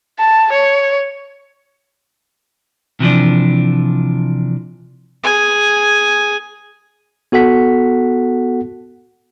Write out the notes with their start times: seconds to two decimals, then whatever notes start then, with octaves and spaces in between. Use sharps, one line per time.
0.19 A5
0.52 C#5
3.00 C3 E3 F3 D4
5.23 G#4 G#5
7.32 B3 F#4 A4 F#5 B6